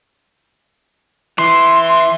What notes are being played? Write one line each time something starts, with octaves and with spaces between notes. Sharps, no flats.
E3 E4 C6